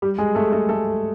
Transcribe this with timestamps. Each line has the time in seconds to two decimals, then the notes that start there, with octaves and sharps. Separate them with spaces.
0.02 G3 G4
0.18 G#3 G#4
0.35 A3 A4
0.52 A3 A4
0.69 A3 A4